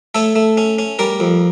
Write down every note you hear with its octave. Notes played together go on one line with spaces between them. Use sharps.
A3 A4 C#5
A3
C#4
C#4
G3 A#4 D5
F2